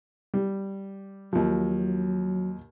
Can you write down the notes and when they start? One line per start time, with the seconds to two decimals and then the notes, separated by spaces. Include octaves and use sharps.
0.34 G3
1.33 D#2 F3 F#3